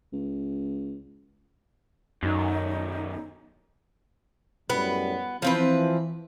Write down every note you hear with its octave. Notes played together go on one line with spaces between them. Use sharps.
C#2
F#2 B2 D#3 D#4
F#2 A2 G3 B3
E3 F3 C4 B4